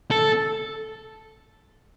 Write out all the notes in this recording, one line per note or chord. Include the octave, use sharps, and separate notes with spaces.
A4